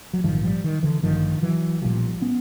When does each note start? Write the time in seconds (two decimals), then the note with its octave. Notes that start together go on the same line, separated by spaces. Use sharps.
0.14 F#3
0.24 A#1 G#2 D#3 F3
0.43 F3 G3
0.64 D#3
0.83 D3 E3
1.03 A1 G2 D3 D#3 F3
1.43 E3 F#3
1.82 B1 A#2 F3 G3
2.21 B3 C#4